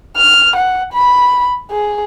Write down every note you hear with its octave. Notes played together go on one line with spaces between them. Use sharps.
F6
F#5
B5
G#4